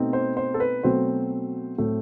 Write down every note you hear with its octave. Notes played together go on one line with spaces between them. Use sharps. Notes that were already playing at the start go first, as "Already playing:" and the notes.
Already playing: B2 A3 C4 D#4
C5
C5
A4
B4
B2 F#3 A3 C4 C5
A2 F#3 A3 C4